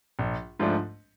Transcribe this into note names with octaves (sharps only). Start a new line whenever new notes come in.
A#1
G#2 F3 A3 D4